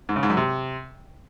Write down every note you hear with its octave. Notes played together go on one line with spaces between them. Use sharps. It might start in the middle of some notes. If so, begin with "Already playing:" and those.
G#2
C#3
G#2
F#2
C3